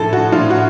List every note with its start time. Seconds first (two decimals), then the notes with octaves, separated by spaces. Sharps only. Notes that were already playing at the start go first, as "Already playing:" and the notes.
Already playing: A2 F3 A4
0.13 F#4
0.32 A2 F3 F4
0.50 F#4